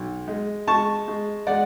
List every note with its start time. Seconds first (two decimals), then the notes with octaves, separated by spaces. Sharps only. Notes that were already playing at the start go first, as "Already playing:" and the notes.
Already playing: B1
0.28 G#3
0.68 G#3 A5 C#6
1.08 G#3
1.47 G#3 D5 F#5